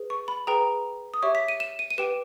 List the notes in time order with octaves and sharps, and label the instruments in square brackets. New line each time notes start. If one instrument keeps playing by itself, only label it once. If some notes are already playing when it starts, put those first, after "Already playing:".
Already playing: [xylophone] G#4 B4
C#6
B5
G#4 B4 G5 A#5
D#6
G4 C#5 E5 C#6
B6
D#7
E7
D#7
D#7
G4 B4 G5 E7